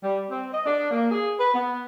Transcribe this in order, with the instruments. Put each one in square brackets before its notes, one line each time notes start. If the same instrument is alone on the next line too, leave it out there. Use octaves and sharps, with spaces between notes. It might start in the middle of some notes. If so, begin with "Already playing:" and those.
[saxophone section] G3
C4
D#5
D4
A#3
G#4
B4
B3